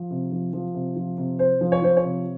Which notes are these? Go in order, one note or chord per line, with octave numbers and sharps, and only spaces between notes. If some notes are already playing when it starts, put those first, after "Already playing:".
Already playing: F3
C3
F3
F3
C3
F3
C3
C3 C5
F3
C#5
F3 C5
C#5
C3